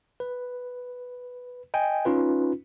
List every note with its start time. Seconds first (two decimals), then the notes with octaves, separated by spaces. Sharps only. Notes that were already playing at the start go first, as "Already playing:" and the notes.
0.20 B4
1.74 D#5 G5 G#5
2.05 C#4 D#4 F4 B4